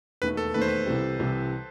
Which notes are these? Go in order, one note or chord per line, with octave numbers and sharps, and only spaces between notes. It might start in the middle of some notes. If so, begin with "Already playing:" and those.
E1 D#2 D#3 A3 B4
A4
E1 D#2 D#3 A3 B4
C5
B4
C2 C3 E3 G3
C2 C3 E3 G3